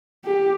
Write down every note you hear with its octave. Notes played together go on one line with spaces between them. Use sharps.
G4